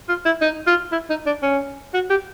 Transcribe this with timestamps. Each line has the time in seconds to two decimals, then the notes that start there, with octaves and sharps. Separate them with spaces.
0.09 F4
0.26 E4
0.41 D#4
0.67 F4
0.92 E4
1.10 D#4
1.26 D4
1.43 C#4
1.94 F#4
2.10 G4